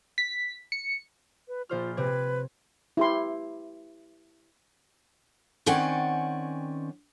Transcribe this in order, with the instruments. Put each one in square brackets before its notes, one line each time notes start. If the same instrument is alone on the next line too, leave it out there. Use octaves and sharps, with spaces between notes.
[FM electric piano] B6
C#7
[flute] B4
[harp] A#1 C5 F6 [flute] F4
[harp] C3 C4 G#6 [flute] B4
[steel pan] E4 G4 C6
[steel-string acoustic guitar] D#3 C4 C#4 D5 F#5 G#5